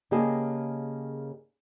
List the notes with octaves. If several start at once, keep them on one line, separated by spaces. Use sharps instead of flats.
C#3 A#3 G4 G#4 D#5 A5